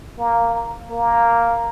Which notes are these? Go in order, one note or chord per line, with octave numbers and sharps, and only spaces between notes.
A#3
A#3